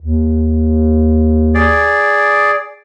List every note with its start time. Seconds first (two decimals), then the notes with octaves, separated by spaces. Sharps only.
0.01 D#2
1.54 G#4 D5